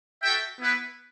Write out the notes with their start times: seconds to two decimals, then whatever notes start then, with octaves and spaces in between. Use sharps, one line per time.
0.22 F#4 A4 E5 G5
0.59 B3 E4 B4